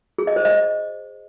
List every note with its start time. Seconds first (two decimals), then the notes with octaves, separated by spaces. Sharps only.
0.18 G#4
0.27 D#5
0.36 C5
0.45 D#5